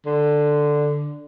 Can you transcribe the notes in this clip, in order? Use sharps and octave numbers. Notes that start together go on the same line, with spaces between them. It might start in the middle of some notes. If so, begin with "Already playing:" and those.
D3